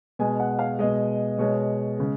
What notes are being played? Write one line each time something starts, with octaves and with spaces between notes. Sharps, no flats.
B2 G#3 G#5
F#5
F5
B2 G#3 D#5
B2 G#3 C#5
C#3 G#3